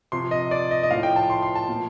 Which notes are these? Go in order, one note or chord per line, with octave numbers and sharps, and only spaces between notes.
C3 F3 C6
D#5
D5
D#5
D#5
A2 F3 F5
G5
A5
C6
C6
A5
A#2 F3